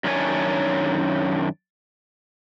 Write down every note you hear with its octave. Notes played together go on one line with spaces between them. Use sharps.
F#2 D#3 D4 G4 C#5 G#5